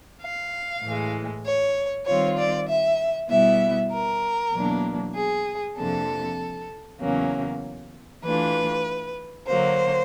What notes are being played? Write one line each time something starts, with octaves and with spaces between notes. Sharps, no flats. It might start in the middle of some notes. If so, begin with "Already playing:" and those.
F5
A2 E3 G#3
C#5
D#3 G3 C4 F4 C#5
D5
E5
B2 G3 B3 E4 E5
A#4
E2 B2 F#3 A#3 D4
G#4
F2 C3 F3 A#3 D4 A4
E2 C#3 F#3 A#3 C#4
E3 A3 D4 F4 B4
D3 F#3 A#3 C5